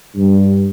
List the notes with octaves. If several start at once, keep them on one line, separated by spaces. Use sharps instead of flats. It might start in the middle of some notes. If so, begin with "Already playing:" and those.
G2